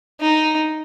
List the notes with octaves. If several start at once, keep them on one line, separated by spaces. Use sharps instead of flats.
D#4